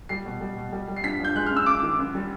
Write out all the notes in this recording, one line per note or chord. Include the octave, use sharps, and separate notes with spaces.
G3 C7
B2
G3
B2
G3
G3
C7
G2 B6
G2 G6
G#3 F#6
F6
F#2
E6
F#2 D6
D#3
F#2
G3